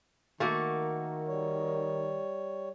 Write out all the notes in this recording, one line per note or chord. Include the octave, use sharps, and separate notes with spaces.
D#3 A3 A#3 F#4
G3 C#5